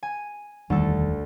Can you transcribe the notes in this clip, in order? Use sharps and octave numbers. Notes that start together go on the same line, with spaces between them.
G#5
E1 D2 D#3 G3 A4